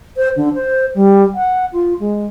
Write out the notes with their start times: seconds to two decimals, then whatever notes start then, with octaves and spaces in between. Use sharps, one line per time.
0.17 C5
0.36 D3
0.54 C5
0.95 G3
1.34 F#5
1.73 F4
2.00 G#3